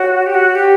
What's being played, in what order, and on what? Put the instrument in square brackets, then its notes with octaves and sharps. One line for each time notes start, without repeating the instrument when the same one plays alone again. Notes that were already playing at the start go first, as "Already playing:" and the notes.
Already playing: [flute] F#4 [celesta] C#5
[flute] G4
F#4
G4